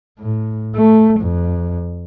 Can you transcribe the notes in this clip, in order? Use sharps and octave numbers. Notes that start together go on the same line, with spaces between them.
A2
A3
F2